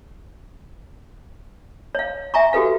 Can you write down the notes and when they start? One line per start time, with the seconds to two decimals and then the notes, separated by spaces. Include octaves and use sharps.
1.95 C#5 F5
2.34 E5 G#5 A#5 C#6
2.53 F#4 G4 A4 B4 F5